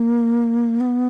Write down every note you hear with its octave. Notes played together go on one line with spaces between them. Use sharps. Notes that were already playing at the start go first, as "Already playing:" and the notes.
Already playing: A#3
B3